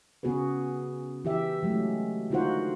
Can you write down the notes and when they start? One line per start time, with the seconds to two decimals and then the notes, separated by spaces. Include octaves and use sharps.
0.23 C#3 B3 F#4 G#4 B4
1.25 E3 G4 E5
1.62 E3 F#3 G#3 A3
2.30 D3 D#4 F4 F#4 C5 F#5